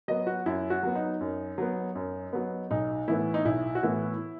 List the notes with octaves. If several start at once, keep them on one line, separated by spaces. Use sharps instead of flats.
F#3 B3 D#5
F#4
F#2 E4
F#4
F#3 B3
D#4
F#2
F#3 B3
F#2
F#3 B3
B1 D#4
A2 E3 B3 E4
D#4
B1 E4
F#4
A2 E3 B3 E4